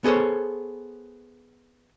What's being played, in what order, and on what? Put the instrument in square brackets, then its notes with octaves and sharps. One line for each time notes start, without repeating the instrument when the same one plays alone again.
[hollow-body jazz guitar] B3 G#4 A4 C5 C#5